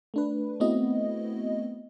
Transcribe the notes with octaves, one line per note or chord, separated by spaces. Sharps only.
A3 D4 B4
A3 B3 C4 E4 F#4 D#5